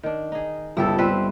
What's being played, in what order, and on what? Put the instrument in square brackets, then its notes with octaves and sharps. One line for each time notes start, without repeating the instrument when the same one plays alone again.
[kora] D#3 D4
D#4 G#4
[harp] G1 C#2 [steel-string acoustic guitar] E4 G4 A4
[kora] G3 A4 B4 [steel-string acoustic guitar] C4 [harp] E5 C6